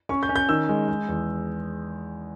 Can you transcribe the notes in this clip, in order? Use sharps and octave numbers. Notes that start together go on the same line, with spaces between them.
C#4 C#6
G6
C#4
G6
D#3 E6
G#3
G#3
E2